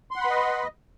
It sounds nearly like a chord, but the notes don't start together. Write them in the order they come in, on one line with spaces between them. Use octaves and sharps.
C6 F#5 B5 B4 D#5